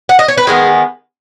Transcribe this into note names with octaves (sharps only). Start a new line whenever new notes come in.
F#5
D#5
C#5
B4
D#3 G#3 B3 G#4